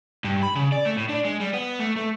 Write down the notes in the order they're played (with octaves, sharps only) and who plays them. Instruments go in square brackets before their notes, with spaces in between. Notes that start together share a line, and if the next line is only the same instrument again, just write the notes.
[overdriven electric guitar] G2
B5
C#3
D5
A3
A2
D4
G#3
G3
B3
A3
A3